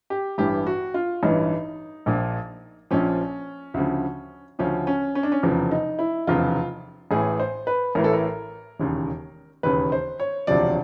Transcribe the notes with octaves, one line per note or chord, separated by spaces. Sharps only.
G4
A1 G2 E3 G4
F#4
F4
A1 G2 E3 D#4
A#1 A#2 F3
A#1 A#2 F3 C#4
D2 C#3 F3
D2 C#3 F3 C#4
C#4
C#4
D4
C#4
F1 E2 C#3 F3
D#4
E4
F1 E2 C#3 F3 F4
A1 A2 E3 G#4
C5
B4
A1 A2 E3 A#4
A4
A#4
E1 D#2 C#3
E1 D#2 C#3 B4
C5
C#5
E1 D2 C3 F3 D5